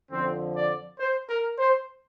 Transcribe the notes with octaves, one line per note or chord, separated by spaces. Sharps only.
F2 D3 F3 C4
D5
C5
A#4
C5